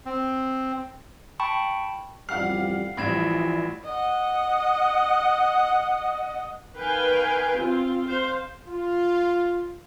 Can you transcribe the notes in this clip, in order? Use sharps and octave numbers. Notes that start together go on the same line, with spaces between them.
C4
G5 A5 B5 C#6
A1 F2 G3 F5 F#5 F6 C7
A1 E3 F3 G3 B5 G#6 E7
D#5 F#5
D#3 B4 F5 G5 G#5
C4 F4
C5 F5
F4